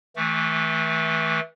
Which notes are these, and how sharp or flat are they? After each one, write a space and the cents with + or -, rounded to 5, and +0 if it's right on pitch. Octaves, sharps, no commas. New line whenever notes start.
E3 -30 A3 +0 D6 -35